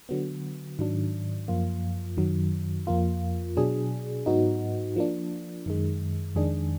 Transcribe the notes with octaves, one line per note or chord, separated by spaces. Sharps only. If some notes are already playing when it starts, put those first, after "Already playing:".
D3 F#3 B3
G#2 D#3 F#3 D4
F#2 F3 A#3 F4
F#2 D#3 F#3
F2 F3 A#3 F4
B2 F#3 D4 G#4
G#2 F#3 B3 D#4 F#4
F3 A#3 D4
F#2 D#3 G#3
F2 D#3 G#3 D4 G#4